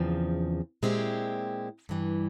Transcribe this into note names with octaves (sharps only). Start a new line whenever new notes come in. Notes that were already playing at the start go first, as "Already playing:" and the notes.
Already playing: E2 C#3 F3 C4
A#2 G#3 C4 E4 G4
G2 E3 G3